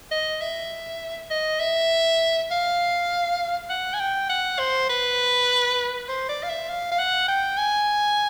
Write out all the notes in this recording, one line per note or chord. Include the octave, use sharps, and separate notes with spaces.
D#5
E5
D#5
E5
F5
F#5
G#5
G5
F#5
C5
B4
C5
D5
F5
E5
F5
F5
F#5
G5
G#5